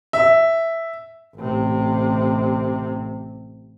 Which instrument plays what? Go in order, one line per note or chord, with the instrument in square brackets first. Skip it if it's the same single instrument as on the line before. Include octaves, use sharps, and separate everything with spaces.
[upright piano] E5
[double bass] A1 C3